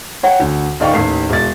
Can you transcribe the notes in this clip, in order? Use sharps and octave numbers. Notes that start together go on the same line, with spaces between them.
C#5 F#5 G5
D2
D#1 D#4 D5 F5 G5 C#6
A1 D#2 C7
E1 A6